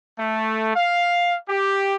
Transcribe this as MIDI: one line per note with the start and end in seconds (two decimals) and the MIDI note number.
0.19 0.74 57
0.76 1.36 77
1.49 1.96 67